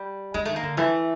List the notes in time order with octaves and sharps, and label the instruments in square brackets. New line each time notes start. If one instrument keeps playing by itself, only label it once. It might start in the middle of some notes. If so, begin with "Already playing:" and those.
Already playing: [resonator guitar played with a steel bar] G3
[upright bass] E3 [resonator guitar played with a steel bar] G#3
[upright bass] D#3 [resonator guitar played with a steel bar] A3
[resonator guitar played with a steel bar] A#3
[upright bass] D3
[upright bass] E3 [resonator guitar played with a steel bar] A3